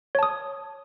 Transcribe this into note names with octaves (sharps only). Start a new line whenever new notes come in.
C#5 A5 D#6